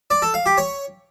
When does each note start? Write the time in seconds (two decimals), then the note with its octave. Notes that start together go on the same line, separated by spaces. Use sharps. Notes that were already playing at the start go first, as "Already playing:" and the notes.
0.10 D5
0.22 A4
0.34 F5
0.46 G4
0.58 C#5